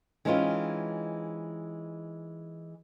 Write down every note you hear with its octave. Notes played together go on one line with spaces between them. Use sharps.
E3 G#3 C4 C#4 D#4 F4